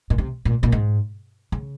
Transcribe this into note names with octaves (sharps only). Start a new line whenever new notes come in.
A#2
C3
A#2
A#2
G#2
C#3